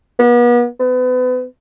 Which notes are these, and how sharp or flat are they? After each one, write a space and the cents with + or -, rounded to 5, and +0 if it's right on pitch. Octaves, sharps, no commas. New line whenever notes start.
B3 -40
B3 +35